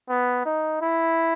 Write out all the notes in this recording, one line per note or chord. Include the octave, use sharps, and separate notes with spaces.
B3
D#4
E4